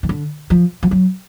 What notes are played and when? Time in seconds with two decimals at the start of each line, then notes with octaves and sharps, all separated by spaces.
0.03 D#3
0.09 D3
0.50 F3
0.83 F3
0.91 F#3